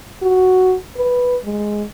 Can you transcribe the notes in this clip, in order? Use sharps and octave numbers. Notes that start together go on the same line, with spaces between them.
F#4
B4
G#3